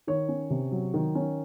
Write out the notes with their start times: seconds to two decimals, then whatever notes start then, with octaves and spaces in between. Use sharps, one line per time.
0.07 D#3 C#5
0.29 C#4
0.50 C3
0.71 F#3
0.94 D#3
1.15 C#4